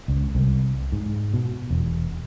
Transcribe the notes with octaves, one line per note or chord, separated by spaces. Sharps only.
C#2
C2
G#2
B2
E1